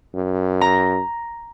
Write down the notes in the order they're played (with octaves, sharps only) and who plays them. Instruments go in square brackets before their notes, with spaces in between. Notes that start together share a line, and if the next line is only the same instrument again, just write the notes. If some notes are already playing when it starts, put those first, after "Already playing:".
[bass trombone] F#2
[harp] A#5